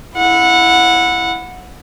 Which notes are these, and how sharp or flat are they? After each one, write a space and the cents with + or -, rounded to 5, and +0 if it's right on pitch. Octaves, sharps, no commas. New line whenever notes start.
E4 +10 F#5 -20